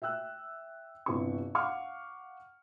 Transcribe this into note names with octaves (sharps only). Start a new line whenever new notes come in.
E5 G5 E6 F#6
G1 C3 E4 C#6
F5 F#5 C#6 D6 F6